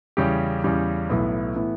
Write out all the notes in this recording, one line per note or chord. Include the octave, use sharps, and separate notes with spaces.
E2 C#3 G3 C#4 G4
E2 C#3 G3 C#4 G4
B1 A2 E3 B3
A2 E3 B3